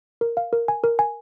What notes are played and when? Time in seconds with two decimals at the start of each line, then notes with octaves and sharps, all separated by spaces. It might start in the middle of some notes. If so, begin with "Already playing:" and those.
0.21 A#4
0.37 F5
0.53 A#4
0.68 G#5
0.84 A#4
0.99 G#5